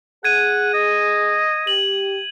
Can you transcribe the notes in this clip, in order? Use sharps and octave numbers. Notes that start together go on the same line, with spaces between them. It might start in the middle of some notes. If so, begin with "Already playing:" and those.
G#4 F#5 G#6 D#7
D#5
G4 F#7